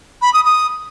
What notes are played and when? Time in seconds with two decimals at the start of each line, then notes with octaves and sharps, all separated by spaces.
0.22 B5
0.34 D#6
0.45 D#6